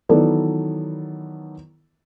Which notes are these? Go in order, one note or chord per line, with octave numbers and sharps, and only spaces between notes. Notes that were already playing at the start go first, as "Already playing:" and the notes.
D#3 E3 F#3 B3 A4 D5